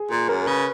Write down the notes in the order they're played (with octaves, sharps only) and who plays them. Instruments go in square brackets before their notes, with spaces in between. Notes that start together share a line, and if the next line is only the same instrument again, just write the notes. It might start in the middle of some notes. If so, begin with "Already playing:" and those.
Already playing: [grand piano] G#4
[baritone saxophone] A#2 [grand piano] G#4
[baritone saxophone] F#2 [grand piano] A#4
[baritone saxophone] C#3 [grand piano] B4